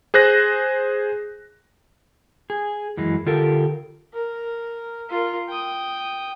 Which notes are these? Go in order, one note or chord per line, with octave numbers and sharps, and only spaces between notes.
G#4 C5 F#6 A#6
G#4
F#2 E3 G#3
D3 F4 G4 A4 A#4
A#4
F4 A#4
G5 D#6